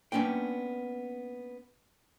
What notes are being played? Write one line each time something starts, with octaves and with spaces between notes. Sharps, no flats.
A#3 B3 C#4 D4 G5